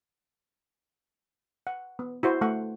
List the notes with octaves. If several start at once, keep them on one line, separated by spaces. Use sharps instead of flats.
F#5
B3
E4 F#4 C5
A3 F#5